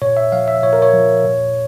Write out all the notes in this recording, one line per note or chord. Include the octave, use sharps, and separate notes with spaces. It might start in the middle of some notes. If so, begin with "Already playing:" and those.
A#2 C#5
E5
F3 F5
E5
A#2 C#5
A#4
C#5
F3
A#2